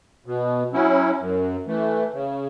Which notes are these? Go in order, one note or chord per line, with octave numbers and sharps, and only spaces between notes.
B2
F#3 C#4 E4
F#2
E3 A3
C#3